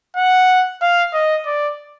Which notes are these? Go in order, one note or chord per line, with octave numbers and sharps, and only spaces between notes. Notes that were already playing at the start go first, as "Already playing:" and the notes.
F#5
F5
D#5
D5